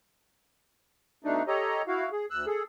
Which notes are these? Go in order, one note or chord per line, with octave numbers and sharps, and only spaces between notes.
B2 A3 D4 D#4
G4 A4 C#5 D#5 A#5
E4 F#4 F5
G#4
D2 E6 F#6
G#4 A4